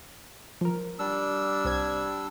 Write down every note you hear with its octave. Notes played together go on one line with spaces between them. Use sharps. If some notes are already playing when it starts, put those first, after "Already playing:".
F3 A#4
G3 D4 E6
C2 C4 G#6